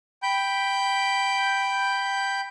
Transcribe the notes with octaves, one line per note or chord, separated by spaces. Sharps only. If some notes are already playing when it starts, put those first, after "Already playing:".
G5 B5 G6